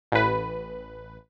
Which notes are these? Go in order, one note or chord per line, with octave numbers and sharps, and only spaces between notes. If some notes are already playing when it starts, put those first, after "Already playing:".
A1 B4